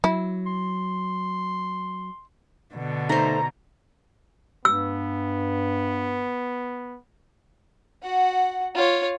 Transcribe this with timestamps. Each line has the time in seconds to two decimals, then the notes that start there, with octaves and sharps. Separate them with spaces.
0.04 F#3 E4
0.46 C6
2.74 B2 D3
3.09 A3 D#4 C5 A#5
4.65 G2 B3 E6
8.02 F#4 F#5
8.75 F4 C#5